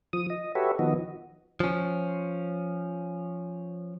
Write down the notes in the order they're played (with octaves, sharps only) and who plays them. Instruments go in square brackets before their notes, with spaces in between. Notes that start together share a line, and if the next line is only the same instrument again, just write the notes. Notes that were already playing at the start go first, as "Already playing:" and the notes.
[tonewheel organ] F3 D#6
D#5
F#4 G4 A4 B4 C#5 E5
D#3 F3 B3 F#4 D#5
[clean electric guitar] F3 C#4